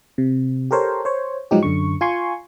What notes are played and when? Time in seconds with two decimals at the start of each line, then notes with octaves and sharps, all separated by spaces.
0.18 C3
0.71 G4 A4 A#4 C5 C#5
1.05 C5 C#5
1.51 G#2 F3 F#3 D#4 G4
1.63 F#2 D3 C#6
2.01 F4 G#5 C6 C#6